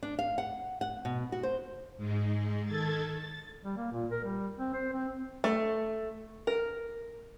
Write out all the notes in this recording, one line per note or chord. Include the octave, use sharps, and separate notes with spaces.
D4
F5
F#5
F#5
B2
F#4
C5
G#2 G#3
D#3 A4 G#6 A6
A6
G3
A#3
A#2
A#4
G3
C4
C5
C4
A3
A#4